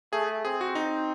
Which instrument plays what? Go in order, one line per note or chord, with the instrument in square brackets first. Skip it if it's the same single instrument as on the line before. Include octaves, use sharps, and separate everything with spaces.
[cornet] A3 [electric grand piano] G#4
[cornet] C4 [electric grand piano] G#4
[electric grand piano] F#4
D#4